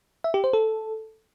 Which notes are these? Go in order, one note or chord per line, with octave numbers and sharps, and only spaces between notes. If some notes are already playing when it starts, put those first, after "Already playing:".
E5
G4
C5
A4